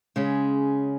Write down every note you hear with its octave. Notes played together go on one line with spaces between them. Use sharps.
C#3 G#3 C#4 G#4